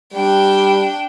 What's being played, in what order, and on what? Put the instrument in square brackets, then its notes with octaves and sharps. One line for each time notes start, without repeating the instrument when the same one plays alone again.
[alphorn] G3 [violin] D4 G5